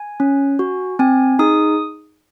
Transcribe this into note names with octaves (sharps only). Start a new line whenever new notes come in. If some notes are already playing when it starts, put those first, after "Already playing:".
Already playing: G#5
C#4
F#4
C4 G#5
D#4 G#4 D#6